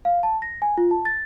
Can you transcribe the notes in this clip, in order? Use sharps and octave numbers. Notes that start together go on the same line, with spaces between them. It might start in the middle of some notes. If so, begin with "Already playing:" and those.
F5
A5
A#6
G#5
F4
A5
A6